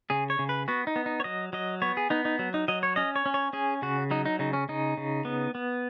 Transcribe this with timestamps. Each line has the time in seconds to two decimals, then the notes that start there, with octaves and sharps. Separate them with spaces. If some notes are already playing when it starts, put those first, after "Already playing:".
0.10 C#3 G#4
0.30 C#5
0.39 C#3
0.49 B4
0.68 B3 F#4
0.87 D#4
0.96 B3
1.06 D#4
1.20 C#5
1.24 F#3 D#5
1.53 F#3 D#5
1.82 B3 C#5
1.97 G#4
2.10 B3 D#4
2.25 D#4
2.39 F#3
2.54 D#4
2.68 F#3 D#5
2.83 C#5
2.96 C#4 D#5
3.16 C#5
3.26 C#4
3.34 C#5
3.53 C#4 G#4
3.82 C#3 F#4
4.11 F#3 D#4
4.25 D#4
4.39 C#3 D#4
4.53 C#4
4.69 C#3 D#4
4.97 C#3
5.25 B3
5.55 B3